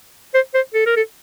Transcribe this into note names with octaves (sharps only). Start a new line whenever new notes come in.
C5
C5
A4
A#4
A4